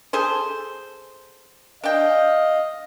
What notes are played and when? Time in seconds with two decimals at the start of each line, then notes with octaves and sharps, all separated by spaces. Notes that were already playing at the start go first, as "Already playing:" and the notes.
0.13 G#4 A4 C5
1.83 D4 D#5 F5 G5